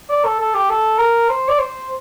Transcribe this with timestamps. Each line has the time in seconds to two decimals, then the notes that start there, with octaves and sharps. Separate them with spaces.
0.10 D5
0.25 A4
0.40 A4
0.54 G4
0.69 A4
0.99 A#4
1.29 C5
1.48 D5
1.59 C5